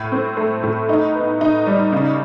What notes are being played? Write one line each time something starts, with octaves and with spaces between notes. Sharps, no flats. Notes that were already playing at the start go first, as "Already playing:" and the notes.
Already playing: A2
C4
A3
A2
D#4
B3
D#4
G3
C#3